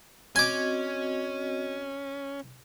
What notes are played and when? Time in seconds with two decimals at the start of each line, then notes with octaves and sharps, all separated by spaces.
0.36 C4 C#4 F#4 D#5 G#5 D6